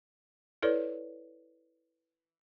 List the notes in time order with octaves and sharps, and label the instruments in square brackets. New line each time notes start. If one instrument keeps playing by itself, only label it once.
[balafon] E4 A4 B4 C#5 D5